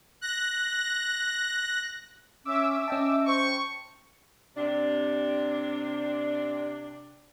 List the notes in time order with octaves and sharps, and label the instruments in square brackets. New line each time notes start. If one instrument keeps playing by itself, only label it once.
[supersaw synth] F#6 A#6
[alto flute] C#4 [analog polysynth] E5 D6 E6
[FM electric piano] C#4 G5 A5 [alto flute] D#5
[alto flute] C5 [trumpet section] C#6
[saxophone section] C3 D4